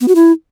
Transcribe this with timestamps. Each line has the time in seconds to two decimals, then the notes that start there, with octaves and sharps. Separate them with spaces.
0.01 B3
0.08 F#4
0.15 E4